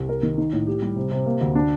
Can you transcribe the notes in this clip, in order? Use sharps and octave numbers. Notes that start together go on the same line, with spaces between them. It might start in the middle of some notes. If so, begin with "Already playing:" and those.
Already playing: C2
A#4
D#3
D#4
A2
G4
G3
C3
C3
A#3
D2
D4